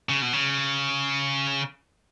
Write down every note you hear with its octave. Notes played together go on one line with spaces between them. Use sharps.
C#3
B2
C#3